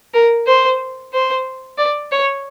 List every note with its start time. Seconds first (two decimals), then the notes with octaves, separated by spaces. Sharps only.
0.14 A#4
0.47 C5
1.13 C5
1.78 D5
2.12 C#5